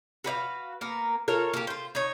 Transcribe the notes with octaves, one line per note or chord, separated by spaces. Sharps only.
F#4 B4 D5 F5
A#3 B3 A#4
F4 A4 A#4 C#5
A#3 G4
F4 C5
D#4 C#5